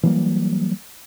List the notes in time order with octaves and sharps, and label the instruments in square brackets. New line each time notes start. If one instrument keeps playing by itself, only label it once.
[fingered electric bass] E3 F#3 G3 A#3